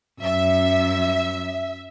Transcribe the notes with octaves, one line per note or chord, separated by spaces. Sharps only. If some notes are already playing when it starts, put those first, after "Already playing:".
F#2 E5